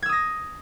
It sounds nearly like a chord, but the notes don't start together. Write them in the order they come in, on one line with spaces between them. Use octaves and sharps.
G#6 E6 D#6 A#6